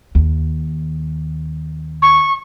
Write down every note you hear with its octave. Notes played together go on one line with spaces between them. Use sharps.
D#2
C#6